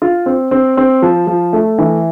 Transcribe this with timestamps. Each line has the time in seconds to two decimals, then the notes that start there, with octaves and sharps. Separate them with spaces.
0.02 F4
0.26 C4
0.51 C4
0.77 C4
1.02 F3
1.27 F3
1.53 A3
1.78 E3